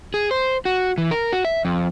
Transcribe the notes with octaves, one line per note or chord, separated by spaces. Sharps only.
G#4
C5
F#4
E3
A#4
F#4
E5
F2